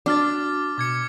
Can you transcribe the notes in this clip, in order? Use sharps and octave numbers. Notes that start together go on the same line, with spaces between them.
D4 F#4 D6 F6 A6
B2 D6 G#6 C#7